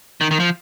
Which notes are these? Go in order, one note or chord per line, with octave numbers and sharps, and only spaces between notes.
D#3
D#3
F3